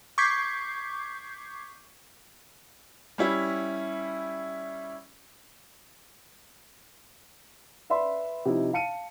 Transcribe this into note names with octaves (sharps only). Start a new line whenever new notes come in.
C#6 D6 G6 G#6 B6 C7
G3 C#4 E4
B4 D5 E5 B5 C6
C3 F3 D#4 E4 D#5
F5 A5 C#7 D#7